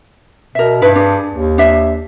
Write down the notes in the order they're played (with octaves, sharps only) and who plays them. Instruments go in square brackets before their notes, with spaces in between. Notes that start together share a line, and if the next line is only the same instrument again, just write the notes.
[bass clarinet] B2 [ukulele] A#4 E5
[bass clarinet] G2 [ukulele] D#4 E4 B4
[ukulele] D4 G#4
[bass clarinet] D#2
[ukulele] D4 E5